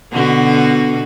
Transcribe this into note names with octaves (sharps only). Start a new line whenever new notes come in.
B2 D3 F#4